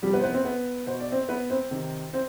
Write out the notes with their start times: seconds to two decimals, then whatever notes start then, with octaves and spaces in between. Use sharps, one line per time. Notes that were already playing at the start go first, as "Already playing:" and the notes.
0.02 C3 F3 G3 G4
0.13 B3 B4
0.19 C5
0.23 B3 B4
0.34 C4 C5
0.44 B3 B4
0.87 B2 C5
1.00 D5
1.12 C4 C5
1.29 B3 B4
1.50 C4 C5
1.71 C3 D#3
2.13 C4 C5